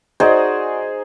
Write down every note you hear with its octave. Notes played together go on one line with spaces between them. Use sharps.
D#4 F#4 G#4 C5 D5 D#5